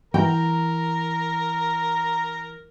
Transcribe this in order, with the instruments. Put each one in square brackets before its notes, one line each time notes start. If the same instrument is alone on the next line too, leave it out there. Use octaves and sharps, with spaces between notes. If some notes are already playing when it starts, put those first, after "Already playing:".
[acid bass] E3 [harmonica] A#4 [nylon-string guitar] G5 [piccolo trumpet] A#5